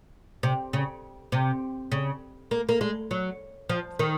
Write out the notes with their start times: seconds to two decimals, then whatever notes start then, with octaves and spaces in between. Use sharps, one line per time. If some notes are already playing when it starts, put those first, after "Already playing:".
0.43 C3
0.73 C#3
1.32 C3
1.92 C#3
2.51 A#3
2.69 A#3
2.81 G#3
3.11 F#3
3.69 F3
3.99 D#3